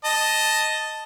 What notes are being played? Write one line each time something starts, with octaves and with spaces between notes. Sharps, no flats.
D#5 A5